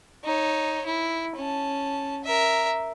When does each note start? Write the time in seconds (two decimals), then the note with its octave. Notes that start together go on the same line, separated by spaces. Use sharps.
0.24 D#4 C#5
0.86 E4
1.36 C#4 A5
2.24 A#4 E5